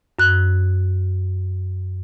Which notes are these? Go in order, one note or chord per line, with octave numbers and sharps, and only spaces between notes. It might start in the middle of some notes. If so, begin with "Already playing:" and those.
F#2 F#6